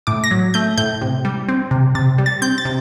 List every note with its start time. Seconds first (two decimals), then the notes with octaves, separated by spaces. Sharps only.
0.07 A2 D6
0.24 A#6
0.31 F#3
0.54 A3 G6
0.78 A2 G6
1.02 C3
1.25 G3
1.49 C4
1.71 C3
1.95 C3 A6
2.18 G3
2.26 A6
2.42 C4 G6
2.58 A6
2.65 C3